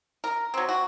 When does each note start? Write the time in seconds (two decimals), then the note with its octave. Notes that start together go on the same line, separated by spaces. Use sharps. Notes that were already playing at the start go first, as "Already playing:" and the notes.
0.24 A#4
0.54 F#3 C4
0.69 F#4